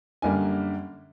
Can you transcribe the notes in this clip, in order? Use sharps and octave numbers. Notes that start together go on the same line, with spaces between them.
F#2 D3 G3 A#3 G#5